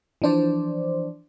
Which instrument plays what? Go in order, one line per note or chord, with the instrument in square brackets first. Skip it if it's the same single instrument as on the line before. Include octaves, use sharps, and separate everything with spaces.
[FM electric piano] E3 F3 D4 C5 D5